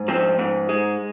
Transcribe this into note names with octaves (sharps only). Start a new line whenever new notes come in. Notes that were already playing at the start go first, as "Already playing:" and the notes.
Already playing: G#2
F3 C4
G#2
G#3